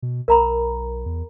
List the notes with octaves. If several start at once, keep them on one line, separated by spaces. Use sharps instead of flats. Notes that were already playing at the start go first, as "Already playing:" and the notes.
B2
B1 A#4 A#5 B5
E2